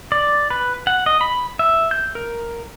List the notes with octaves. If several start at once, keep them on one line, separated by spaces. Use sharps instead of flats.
D5
B4
F#5
D#5
B5
E5
G6
A#4